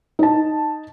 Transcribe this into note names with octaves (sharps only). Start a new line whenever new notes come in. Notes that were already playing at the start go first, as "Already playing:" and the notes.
D#4 A5